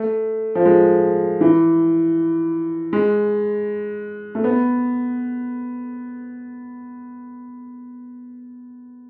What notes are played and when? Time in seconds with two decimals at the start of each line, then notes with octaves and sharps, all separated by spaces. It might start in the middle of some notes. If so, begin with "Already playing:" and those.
Already playing: A3
0.55 F3
0.65 G#3
1.41 E3
2.93 G#3
4.35 A3
4.44 B3